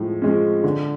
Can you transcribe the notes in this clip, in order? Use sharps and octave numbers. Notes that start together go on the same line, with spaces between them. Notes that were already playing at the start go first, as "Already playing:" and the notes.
Already playing: A2 F3 G#3
F3 G#3 C#4
D3